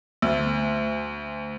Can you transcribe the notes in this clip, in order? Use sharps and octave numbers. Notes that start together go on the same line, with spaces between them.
D2